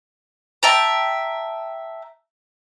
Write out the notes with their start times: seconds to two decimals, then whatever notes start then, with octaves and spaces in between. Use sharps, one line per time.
0.63 E5 G5 A5 A#5